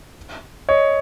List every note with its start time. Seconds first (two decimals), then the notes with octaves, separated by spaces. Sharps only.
0.69 C#5 D#5